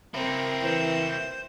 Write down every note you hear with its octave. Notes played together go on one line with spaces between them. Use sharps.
A#3 C4 E4 A#4
E3 C5